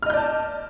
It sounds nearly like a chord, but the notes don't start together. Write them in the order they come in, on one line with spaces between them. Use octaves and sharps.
F6 D#5 G6 D5 A5